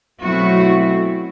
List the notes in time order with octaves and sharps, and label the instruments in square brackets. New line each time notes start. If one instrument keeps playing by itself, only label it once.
[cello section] B2 F#3 A3 C4 E4 F#4